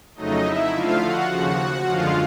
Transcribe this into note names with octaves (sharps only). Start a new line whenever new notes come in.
F2 C#3 F#3 A3 D#4 D#5
E4 E5
D3 F3 A3 F4 F5
F#4 F#5
D#2 C#3 F3 F#4 F#5
F#2 D3 F3 G#3 F4 F5